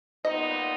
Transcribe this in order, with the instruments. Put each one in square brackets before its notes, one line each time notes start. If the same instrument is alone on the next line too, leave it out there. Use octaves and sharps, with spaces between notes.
[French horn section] A#2 G3 B3 D#4 [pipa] D#5